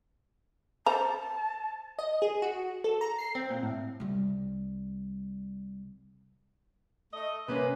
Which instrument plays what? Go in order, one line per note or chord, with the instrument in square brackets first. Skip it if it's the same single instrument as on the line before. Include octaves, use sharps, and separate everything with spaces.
[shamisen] C5 A#5 [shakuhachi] A5
[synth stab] D#5
G#4
F#4
A4
A#5
C7
C4
A#2
A2
[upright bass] C2 G3
[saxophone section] A3 D#5
[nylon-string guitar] C3 A#3 C#4 [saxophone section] B4